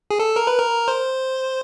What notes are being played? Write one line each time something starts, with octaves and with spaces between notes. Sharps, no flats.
G#4
A4
A#4
B4
A#4
C5